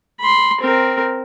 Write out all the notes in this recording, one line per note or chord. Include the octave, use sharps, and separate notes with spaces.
B5 C6
C4 A#4